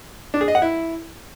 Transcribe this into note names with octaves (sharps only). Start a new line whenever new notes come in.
D4
G#4
D#5
F#5
E4